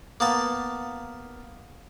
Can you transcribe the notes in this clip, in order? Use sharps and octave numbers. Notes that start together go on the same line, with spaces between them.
A#3 B3 A5